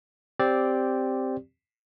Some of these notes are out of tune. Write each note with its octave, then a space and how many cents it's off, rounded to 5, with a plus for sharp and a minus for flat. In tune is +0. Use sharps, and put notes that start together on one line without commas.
C4 +0 G4 +0 D5 -5